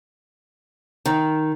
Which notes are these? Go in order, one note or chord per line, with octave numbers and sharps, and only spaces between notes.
D#3